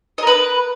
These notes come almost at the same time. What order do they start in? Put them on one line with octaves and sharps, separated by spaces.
D#5 A#4 B4